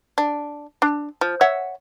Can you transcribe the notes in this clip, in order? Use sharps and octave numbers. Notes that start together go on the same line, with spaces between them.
D4
D4
F3
C#5 E5 F#5